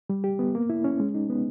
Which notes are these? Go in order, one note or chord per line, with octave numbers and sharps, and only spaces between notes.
G3
G4
B3
A#3
E4
C#4
G#3
D#4
B3